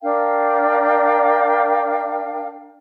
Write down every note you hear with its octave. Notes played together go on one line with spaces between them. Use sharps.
D4 A#4 F5 G5